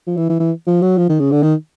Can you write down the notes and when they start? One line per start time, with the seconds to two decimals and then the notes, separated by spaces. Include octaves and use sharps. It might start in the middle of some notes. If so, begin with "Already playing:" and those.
0.07 F3
0.17 E3
0.29 E3
0.40 E3
0.67 F3
0.82 F#3
0.97 F3
1.09 D#3
1.20 C#3
1.32 D3
1.42 D#3